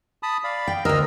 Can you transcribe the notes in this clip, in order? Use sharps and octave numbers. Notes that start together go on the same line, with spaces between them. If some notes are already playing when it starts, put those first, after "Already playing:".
A5 B5 D#6
D5 F5 B5
G5
D2 A#4 D#5 E6 F6